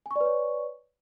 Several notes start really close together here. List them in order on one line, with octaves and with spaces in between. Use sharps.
G#5 C#6 D5 B4 C#5